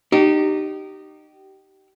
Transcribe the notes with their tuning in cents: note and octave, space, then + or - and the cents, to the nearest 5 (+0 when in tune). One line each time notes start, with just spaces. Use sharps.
D#4 -25 G4 -25